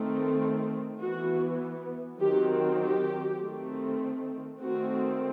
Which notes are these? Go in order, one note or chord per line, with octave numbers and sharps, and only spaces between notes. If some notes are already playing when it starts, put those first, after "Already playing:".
Already playing: D#3 A3 C4
E3 B3 F#4
D#3 F#3 C4 G4
G4
D#3 A3 C4
D#3 A3 C4 F#4